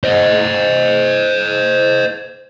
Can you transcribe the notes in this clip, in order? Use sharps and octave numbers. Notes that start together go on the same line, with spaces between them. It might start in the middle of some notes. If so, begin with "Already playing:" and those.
C5 D#5